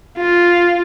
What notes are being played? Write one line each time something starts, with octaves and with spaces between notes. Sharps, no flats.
F4